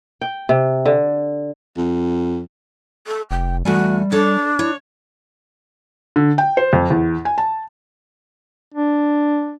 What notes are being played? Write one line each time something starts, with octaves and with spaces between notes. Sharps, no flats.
G5
C3
D3
F2
A4
F1 G5
E2 G3 A3 F#4 G#5
D4 A4 C#5
E4 C#5
D3
G5
C5
F2
E2
G#5
A5
D4